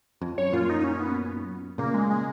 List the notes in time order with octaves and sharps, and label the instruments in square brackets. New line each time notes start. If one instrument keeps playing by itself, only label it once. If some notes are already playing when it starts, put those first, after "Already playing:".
[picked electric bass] F2
[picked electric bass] F#2 [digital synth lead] C#5
[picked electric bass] F#2 A#2 [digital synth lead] F4
[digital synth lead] D#4
D#4
C#4
B3
[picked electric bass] A#2 C#3 [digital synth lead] A#3
[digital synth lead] G#3
G#3